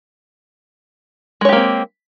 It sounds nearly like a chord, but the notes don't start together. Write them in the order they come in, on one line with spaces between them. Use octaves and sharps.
G#3 C#5 G4 A#3 C4